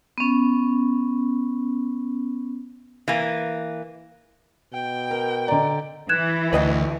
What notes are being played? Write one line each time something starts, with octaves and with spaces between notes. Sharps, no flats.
B3 C#4
E3 A#3
B2 G5
A#4
D3 D5 D#5 A#5
E3 F#6 G#6 E7
D2 B4 D#5 G5